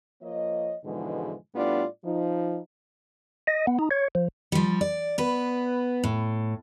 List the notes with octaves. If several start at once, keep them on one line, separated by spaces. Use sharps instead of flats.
F3 A#3 C#5 D#5
G#2 B2 D3 E3 F3 G#3
A2 G3 B3 D4 F4 D5
F3 D#4
D#5
B3
D#4
C#5
F3
F3 G3
D5
B3 B4
A2